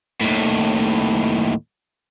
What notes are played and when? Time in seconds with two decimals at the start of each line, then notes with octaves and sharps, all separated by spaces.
0.21 D#2 A2